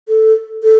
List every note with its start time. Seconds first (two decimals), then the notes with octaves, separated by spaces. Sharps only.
0.08 A4
0.63 A4